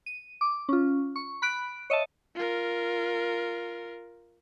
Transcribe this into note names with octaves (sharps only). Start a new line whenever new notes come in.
D#7
D6
C#4 F4
C#6
B5 F#6 D7
C#5 D#5 E5 A5
F4 A#4